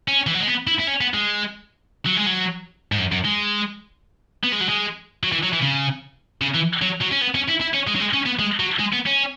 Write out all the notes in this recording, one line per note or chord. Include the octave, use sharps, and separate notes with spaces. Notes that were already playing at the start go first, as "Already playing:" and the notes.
C#4
E3
F#3
G#3
B3
E4
E4
C#4
B3
G#3
F#3
G#3
F#3
G#2
F#2
F#2
G#3
B3
G#3
F#3
G#3
F#3
E3
F#3
E3
C#3
C#3
E3
F#3
F#3
C#4
B3
C#4
E4
E4
C#4
G#3
F#3
G#3
C#4
B3
G#3
F#3
G#3
B3
C#4